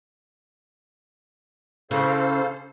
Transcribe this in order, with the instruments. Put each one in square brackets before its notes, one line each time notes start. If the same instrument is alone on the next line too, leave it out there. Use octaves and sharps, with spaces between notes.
[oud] C#3 E3 [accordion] A4 C5 F5